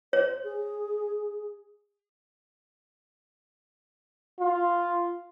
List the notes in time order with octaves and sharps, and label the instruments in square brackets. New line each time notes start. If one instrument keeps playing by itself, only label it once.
[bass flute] C5 [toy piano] C#5
[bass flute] G#4
[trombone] F4